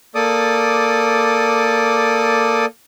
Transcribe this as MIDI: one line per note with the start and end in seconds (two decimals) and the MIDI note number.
0.15 2.66 58
0.15 2.66 69
0.15 2.66 74
0.15 2.66 86
0.15 2.66 87